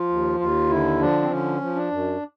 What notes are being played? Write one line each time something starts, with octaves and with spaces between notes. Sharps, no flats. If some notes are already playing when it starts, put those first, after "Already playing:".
Already playing: F3 F4
D#2
D#2 F4
D3 E4
F3 D4
C4
D3 C#4
F3
D4
F#2